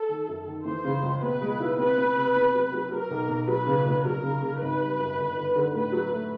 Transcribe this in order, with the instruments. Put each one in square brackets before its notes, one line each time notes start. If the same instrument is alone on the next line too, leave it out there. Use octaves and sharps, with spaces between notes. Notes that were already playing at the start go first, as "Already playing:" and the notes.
Already playing: [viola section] A4
[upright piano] D#3
F#2
D#3
[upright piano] E3 [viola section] C5
[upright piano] C#3
C#2
[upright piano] B2 [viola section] B4
[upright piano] G#3
E4
[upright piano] C4 [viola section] B4
[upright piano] C4
C3
E2
F#3
F#3
[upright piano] F#3 [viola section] A#4
[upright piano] B1
B1
[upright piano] F#3 [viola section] B4
[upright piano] C#3
F1
[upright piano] F#3 [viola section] A#4
[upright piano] C#3
C#3
[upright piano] G#1 [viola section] B4
[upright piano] G3
F#2
G1
G1
D3
[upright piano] A2 [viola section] B4
[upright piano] F#3
A3